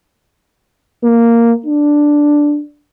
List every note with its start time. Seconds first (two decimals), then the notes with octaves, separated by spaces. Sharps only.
1.04 A#3
1.66 D4